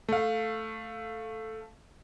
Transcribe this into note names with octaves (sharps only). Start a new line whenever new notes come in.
A3 F5